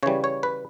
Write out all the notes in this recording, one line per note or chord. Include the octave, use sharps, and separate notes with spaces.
C#3 E3 G3 C#5
C#5
B4